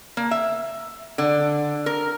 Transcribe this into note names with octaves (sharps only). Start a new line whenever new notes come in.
A#3
E5
D3
A#4